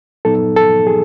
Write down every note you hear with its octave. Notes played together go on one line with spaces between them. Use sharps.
A#2 F#3 B3 D#4 A4
A4
G#4